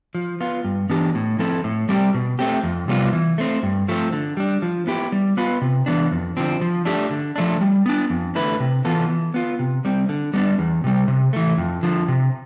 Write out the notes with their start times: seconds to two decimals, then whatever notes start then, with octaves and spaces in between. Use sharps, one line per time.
0.15 F3
0.41 B3 F4
0.65 G2
0.90 E3 B3 D4 G4
1.15 A2
1.39 F3 C4 E4 A4
1.64 A2
1.89 G3 C4 G4
2.14 B2
2.39 A3 C4 G4
2.63 F2
2.88 C3 G3 B3 F4
3.13 E3
3.38 A3 C4
3.63 G2
3.88 F3 A3 C4
4.13 D3
4.37 G3 D4
4.62 F3
4.87 B3 E4 G4
5.12 G3
5.37 B3 F4 B4
5.62 C3
5.86 E3 B3 D4
6.12 F2
6.37 D3 F3 C4
6.61 F3
6.85 A3 D4 G4
7.11 D3
7.36 F3 A3 D4
7.61 G3
7.86 B3 D4
8.10 F2
8.35 D3 A3 E4 B4
8.60 C3
8.85 E3 B3 F4 A4
9.09 E3
9.34 B3 F4
9.59 C3
9.85 G3 C4
10.09 D3
10.34 G3 B3 D4
10.59 E2
10.84 C3 G3
11.08 C3
11.33 E3 A3
11.58 F2
11.83 D3 F3
12.08 C3